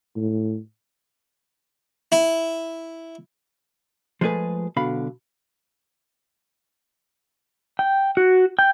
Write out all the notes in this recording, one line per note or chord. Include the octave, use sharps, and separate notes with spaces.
A2
E4
F3 G#3 A3 G#4 A4 B4
B1 B2 D3 F5 B5
G5
F#4
G5